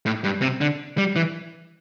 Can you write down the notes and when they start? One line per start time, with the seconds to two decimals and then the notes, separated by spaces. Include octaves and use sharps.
0.06 A2
0.24 G2
0.42 C3
0.61 D3
0.98 G3
1.16 E3